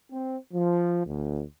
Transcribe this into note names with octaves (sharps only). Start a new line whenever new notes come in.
C4
F3
D2